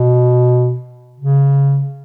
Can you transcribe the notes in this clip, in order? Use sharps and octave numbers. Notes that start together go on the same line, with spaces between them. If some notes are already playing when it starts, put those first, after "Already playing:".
Already playing: B2
C#3